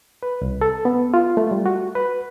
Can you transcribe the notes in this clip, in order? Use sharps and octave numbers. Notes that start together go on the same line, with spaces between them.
B4
C2
A4
B3
F4
A3
G3
F#4
B4